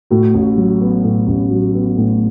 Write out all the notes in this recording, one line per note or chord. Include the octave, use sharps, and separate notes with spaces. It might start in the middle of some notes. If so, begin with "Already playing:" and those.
A2 F#4
A1
F#3
B3
A2
A1
F#3
B3
A2